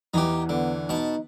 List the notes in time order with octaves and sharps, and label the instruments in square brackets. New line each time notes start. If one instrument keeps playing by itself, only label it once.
[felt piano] E2 E3 [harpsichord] D#4 G4
[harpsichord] D3 [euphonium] B3
[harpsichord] B2 A5 [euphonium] D#4